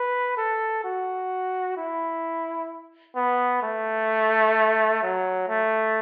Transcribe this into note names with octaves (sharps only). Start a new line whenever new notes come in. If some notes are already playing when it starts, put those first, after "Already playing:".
Already playing: B4
A4
F#4
E4
B3
A3
F#3
A3